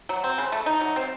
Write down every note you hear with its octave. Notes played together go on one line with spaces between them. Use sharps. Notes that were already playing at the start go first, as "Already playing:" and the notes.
F#3
C4
C#3
A3
D#4
F#3
C4